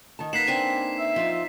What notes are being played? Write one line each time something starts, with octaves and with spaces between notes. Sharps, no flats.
D#3 A5
A#3 D#4 B4 F#5 B6 C7 E7
C4 D4 G#5
E5
F3 D#4 F4